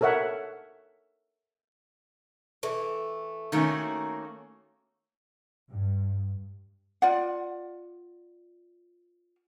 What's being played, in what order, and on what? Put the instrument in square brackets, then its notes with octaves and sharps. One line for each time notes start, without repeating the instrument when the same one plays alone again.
[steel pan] A4 A#4 C#5 E5 F#5
[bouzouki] E3 A3
[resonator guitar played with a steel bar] D#3 A3 C#4 [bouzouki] A#3 F#4
[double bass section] G2
[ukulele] F4 D5 F#5